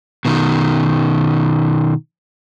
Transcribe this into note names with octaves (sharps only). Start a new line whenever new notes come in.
B2 D#3